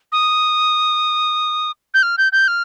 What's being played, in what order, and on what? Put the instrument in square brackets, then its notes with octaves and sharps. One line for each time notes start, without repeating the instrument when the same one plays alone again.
[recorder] D#6
G6
F6
G6
G6
F6